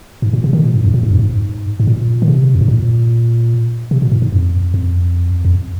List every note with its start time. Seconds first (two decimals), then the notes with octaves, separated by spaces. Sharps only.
0.22 G#2
0.33 A#2
0.44 C3
0.53 D#3
0.64 A#2
0.74 G#2
0.85 F2
0.94 A#2
1.03 G#2
1.11 F2
1.19 G#2
1.80 G#2
1.87 A#2
2.22 D#3
2.28 C3
2.54 F2
2.61 G#2
2.68 A#2
3.91 C3
4.02 A#2
4.12 G#2
4.22 G#2
4.32 F2
4.74 F2
5.45 F2